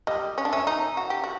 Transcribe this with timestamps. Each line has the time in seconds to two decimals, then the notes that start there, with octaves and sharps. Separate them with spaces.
0.07 G3 D#5
0.38 C#4
0.45 D4
0.52 C#4 E5
0.67 D#4
0.97 F#4
1.10 G4
1.24 F#4